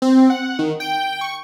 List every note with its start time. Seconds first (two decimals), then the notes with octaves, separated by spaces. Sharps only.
0.02 C4
0.30 F#5
0.59 D#3
0.80 G5
1.21 C#6